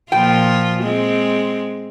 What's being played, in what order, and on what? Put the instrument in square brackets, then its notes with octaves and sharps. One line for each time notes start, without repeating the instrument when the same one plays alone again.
[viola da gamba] A#2 F3 F4 [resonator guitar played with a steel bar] G5
[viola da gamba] G#3 C4